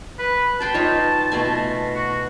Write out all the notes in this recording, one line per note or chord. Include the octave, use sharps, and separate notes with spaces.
B4
B4 G5 A5 C6
D#4 F4 C#5
B2 A3 G#5
F#4